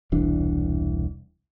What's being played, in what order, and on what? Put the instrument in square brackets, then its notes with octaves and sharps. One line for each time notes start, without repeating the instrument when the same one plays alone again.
[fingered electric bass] E1 C2 E3 D4